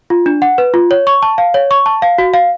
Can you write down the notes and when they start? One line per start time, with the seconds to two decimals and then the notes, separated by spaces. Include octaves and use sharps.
0.10 F4
0.26 D4
0.42 F#5
0.58 B4
0.74 F4
0.91 C#5
1.07 C#6
1.22 A5
1.38 F5
1.54 C#5
1.71 C#6
1.86 A5
2.02 F5
2.18 F#4
2.34 F5